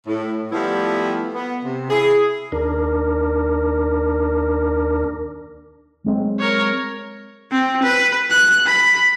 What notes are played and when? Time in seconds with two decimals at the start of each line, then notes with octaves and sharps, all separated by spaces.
0.07 A2
0.52 F3 G3 A3 B3 E4
1.34 B3
1.63 C3
1.90 E4 G#4
2.52 D#2 D4 A#4
6.04 F#3 G#3 C4
6.39 A#4 C#5
7.51 C4
7.83 B4
8.31 F#6
8.66 B5